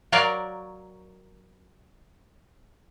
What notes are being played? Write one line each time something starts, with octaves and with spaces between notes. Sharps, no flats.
F#3 A#4 C#5 D5 F5